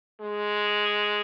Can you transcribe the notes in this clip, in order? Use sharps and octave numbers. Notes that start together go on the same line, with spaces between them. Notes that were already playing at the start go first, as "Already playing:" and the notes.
G#3